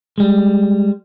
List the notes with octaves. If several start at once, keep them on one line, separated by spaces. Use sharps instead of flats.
G3 G#3